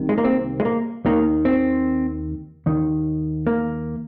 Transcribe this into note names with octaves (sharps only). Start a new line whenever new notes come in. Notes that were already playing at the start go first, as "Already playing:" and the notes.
Already playing: C2 C3 D#3
G#3
A#3
C4
G#3
A#3
D#2 D#3 A#3
C4
D#2 D#3
A#3